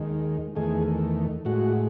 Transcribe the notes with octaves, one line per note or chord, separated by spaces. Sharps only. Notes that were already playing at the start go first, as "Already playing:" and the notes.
Already playing: D#2 D#3 G#3
E2 D#3 A3 G#4
A2 G#3 F#4